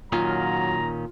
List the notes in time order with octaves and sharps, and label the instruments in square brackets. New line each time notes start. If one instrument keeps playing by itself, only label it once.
[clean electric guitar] A#2 D#3 C#4 [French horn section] F#3 [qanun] F4 [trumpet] A#5